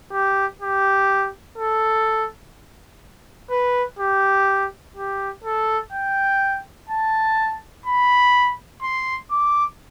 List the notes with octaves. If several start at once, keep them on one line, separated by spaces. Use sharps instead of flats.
G4
G4
A4
B4
G4
G4
A4
G5
A5
B5
C6
D6